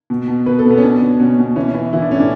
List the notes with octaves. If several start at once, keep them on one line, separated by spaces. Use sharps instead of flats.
B2
B2
B2 B4
A4
B2
B3
C#4
B2 D4
B2
B2 C#4
B2
E3 C#4
E3
E3 E4
D4
A2 C#4
D4